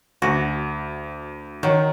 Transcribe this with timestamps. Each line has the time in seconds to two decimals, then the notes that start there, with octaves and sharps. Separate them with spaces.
0.22 D2 F#4
1.63 D#3 F#3